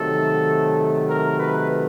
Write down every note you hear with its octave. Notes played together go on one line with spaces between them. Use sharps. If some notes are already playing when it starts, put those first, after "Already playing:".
Already playing: C3 D#3 F#3 A3 A4
A#4
B4